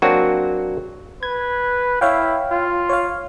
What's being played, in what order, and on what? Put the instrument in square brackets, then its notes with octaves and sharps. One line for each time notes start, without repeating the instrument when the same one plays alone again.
[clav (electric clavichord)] F#3 A#3 C4 D4 F#4
[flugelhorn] B4 [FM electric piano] G#6
[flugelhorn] E4 [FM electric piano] C#5 F5 G5
[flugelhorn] F4
[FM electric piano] C#5 F5